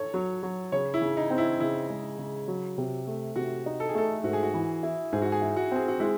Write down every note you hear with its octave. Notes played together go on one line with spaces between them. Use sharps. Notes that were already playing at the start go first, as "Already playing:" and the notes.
Already playing: A4 C#5
F#3
F#3
C#3 C#5
E4
C#3
D#4
C4
E4
C#3 E4
G#3
C#3
F#3
C3
A3
C3 F#4
D#4
A4
G#4
A3 A4
G#2 F#4
G#4
F#4
E3
E4
G#2 G#4
F#4
G#4
E4
F#4
C4 G#4
F#4
G#3 E4